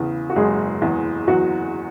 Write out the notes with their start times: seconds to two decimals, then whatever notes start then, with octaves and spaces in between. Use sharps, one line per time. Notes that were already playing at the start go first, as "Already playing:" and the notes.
Already playing: E2 C#3
0.30 F#4
0.36 F#1 G#3 G#4
0.82 E2
1.27 E2 F#3 F#4